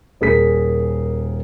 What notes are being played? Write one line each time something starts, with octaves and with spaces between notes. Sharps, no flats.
D#1 G#4 A#4 B6